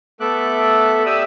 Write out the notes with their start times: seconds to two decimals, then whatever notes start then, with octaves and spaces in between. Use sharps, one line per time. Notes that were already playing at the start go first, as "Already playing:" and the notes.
0.20 A3 B3 A4 E5 D6 F#6
1.06 G4 D5 E5 D#6 E6